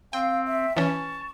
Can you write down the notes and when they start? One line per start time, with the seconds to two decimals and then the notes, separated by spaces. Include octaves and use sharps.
0.13 C4 F5 G5
0.47 E5
0.77 E3 C#4 A5 C#6